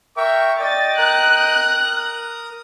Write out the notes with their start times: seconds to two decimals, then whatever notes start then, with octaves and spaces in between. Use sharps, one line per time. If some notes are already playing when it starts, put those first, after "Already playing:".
0.17 A#4 E5 G5 C#6
0.59 D5 D#5 G5 A6
0.98 A#4 A#5 D#6 F#6